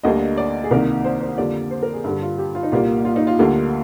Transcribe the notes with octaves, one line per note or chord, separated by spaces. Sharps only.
D2 D3 G3 A#3 D#5
D5
G#4
C2 C3 D#3 A#3 A#4
C5
C5
F2 D3 G3 A#3 D5
C5
A#4
G#4
G2 D3 G3
F4
G4
F4
D#4
C2 A#2 G3 A#3 F4
F4
D#4
F4
D2 D3 G3 A#3